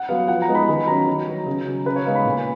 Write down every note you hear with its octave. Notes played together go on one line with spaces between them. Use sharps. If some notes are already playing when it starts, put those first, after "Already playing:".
Already playing: F#5
F#3 B3 F5
F3 F#5
A#5
G#3 B3 D#4
B5
D#3 B5
F#3 C#4 A#5
D#3
F#3 B3
C#3
F#3 C#4
C#3 B4
C#5
G#3 B3 D#4 F5
B5
A#2